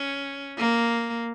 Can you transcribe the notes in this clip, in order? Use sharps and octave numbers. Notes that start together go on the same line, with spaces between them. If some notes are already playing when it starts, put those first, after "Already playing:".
Already playing: C#4
A#3